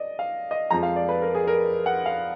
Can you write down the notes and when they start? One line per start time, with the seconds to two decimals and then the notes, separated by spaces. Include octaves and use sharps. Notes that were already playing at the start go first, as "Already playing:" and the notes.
Already playing: D5 D#5
0.19 F5
0.51 D#5
0.70 F2 F3 G#3 A#5
0.83 F5
0.96 D5
1.09 B4
1.22 A#4
1.35 G#4
1.47 A#4
1.86 F#5
2.06 F5